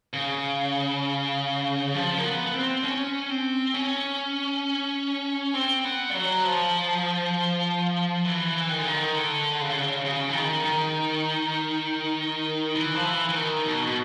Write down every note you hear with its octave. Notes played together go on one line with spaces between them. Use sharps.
C#3
F3
A#3
B3
B3
C4
C#4
C4
C#4
C4
B3
G3
F#3
F3
E3
D#3
D3
D#3
D3
C#3
D3
C#3
C#3
E3
D#3
D#3
E3
F3
E3
E3
D#3
B2
B2